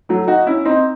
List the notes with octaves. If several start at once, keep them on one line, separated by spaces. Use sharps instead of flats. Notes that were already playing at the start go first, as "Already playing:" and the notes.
F#3 A3
D#4 F#4
C#4 E4
C4 D#4